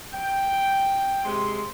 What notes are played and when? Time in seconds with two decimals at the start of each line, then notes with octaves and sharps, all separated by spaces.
0.14 G5
1.25 C3 G#3 C6